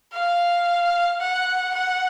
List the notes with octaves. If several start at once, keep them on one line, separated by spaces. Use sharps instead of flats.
F5
F#5
F#5